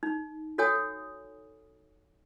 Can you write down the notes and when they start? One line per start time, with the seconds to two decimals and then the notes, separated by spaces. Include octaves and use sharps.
0.03 D#4
0.58 F#4 A4 C#5 F#5 G#5 D#6